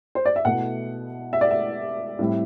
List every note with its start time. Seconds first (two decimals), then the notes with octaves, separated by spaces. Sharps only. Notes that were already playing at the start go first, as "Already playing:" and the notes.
0.15 C5
0.26 D5
0.36 E5
0.45 B2 A3 E4 F#5
1.33 E5
1.41 D5
1.51 E5
2.19 A2 G3 C4 E4